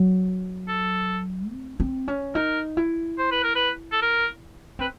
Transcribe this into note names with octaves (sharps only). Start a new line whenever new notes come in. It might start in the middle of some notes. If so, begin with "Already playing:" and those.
Already playing: F#3
A4
C4
C4
C#4
D#4 A#4
E4
C5
B4
A#4
B4
A4
A#4
C4 B4